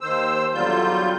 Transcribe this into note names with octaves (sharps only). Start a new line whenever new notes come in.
D#2 D#3 C5 E6
E2 D3 F#3 G3 F4 G6